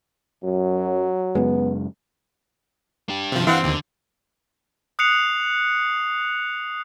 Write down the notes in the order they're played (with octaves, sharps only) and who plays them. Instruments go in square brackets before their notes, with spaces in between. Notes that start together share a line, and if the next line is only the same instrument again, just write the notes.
[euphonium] F#2 [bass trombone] F#3
[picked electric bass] F#2 C#3 G#3 [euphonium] B3
[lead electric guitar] D4 G4
[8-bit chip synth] C3 F3
[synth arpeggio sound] E3 [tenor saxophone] C4 [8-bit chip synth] F5 F#5
[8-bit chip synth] D#2 [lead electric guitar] D3
[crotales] D#6 F#6 C7 C#7 F7